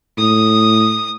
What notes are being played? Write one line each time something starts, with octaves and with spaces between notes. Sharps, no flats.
A2 D#6